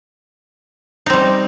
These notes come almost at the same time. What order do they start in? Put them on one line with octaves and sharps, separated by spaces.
D#4 C4 G3